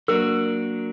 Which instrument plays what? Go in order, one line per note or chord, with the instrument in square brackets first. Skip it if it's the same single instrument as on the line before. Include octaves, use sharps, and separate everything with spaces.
[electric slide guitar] F#3 A#3 D4 F#4 [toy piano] A#4